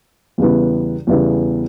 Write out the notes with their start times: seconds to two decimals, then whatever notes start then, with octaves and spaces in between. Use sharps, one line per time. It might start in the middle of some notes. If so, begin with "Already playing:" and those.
0.38 E2 C#3 G3 B3 E4
1.07 E2 C#3 G3 B3 E4